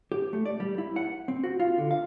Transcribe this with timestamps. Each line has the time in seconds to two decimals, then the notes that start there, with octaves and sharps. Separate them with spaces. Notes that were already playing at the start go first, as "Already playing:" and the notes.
0.12 G4
0.33 A3
0.45 D5
0.60 G3
0.78 E4
0.96 F#5
1.28 C4
1.44 F#4
1.60 F4
1.78 D3
1.91 F5